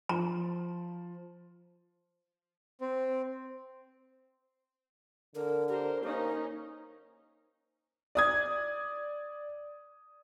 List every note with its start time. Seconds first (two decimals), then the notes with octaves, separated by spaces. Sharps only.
0.09 F3 A#5
2.81 C4
5.35 D3 A#4
5.69 G4 A#4 C5
6.04 A#3 C#4 D#4 C5
8.15 D5 D#6 G#6